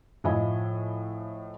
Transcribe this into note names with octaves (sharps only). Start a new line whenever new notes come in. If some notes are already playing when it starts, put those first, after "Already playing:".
A2 F3 D#5 E5 G#5 B5